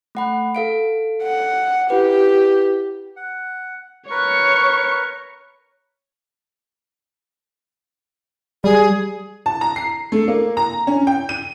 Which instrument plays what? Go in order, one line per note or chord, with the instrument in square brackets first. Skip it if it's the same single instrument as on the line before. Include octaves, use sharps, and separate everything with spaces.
[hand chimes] A3 F#5 B5
A4 F5 D7
[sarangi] F#5
[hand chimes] E4 B4 [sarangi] G4
[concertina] F#5
[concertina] A#4 B4 [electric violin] C#5 C#6
[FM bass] G3 [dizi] G#4
[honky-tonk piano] A5
A#5
C7
A3
A#3
A#5
C#4
G5
D#7